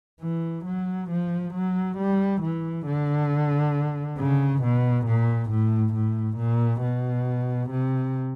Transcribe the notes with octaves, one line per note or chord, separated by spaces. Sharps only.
E3
F#3
F3
F#3
G3
E3
D3
C#3
B2
A#2
A2
A2
A#2
B2
C3